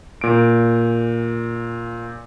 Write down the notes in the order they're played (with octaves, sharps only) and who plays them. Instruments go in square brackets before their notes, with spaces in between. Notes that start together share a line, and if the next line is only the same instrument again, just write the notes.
[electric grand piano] A#2 D7